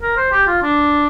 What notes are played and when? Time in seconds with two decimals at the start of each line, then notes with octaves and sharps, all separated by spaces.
0.02 A#4
0.17 C5
0.32 G4
0.47 F4
0.62 D4